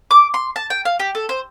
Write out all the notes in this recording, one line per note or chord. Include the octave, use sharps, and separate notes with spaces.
D6
C6
A5
G5
F5
G4
A4
C5